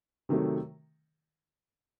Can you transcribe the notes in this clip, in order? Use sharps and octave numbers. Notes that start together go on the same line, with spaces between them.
C3 D#3 F#3 A3